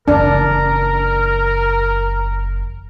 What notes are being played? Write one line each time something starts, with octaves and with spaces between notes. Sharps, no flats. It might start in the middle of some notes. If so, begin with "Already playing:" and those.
F#1 E3 D4 A#4